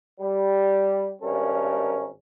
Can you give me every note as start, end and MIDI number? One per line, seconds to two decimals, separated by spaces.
0.19 1.10 55
1.22 2.07 32
1.22 2.07 43
1.22 2.07 61
1.22 2.07 70